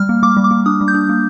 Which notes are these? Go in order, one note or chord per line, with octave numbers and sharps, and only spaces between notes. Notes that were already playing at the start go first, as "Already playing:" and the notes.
Already playing: G3 F6
A#3
A#3 D6
G3
D6
A#3
D4 D#6
G3
G6
D4
A#3